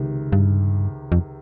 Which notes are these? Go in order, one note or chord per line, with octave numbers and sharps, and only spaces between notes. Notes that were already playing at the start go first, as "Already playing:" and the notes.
Already playing: C#2 C3 D#3
G2
F2